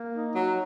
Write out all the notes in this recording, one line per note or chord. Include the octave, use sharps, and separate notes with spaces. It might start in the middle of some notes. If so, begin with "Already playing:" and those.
Already playing: A#3
D#4
F#3